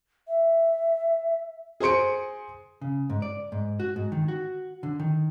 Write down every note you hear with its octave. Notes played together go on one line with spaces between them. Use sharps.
E5
G#4 C5 C6 C#7 D7
C#3
G#2
D5
G#2
F#4
G#2
D#3
F#4
D3
D#3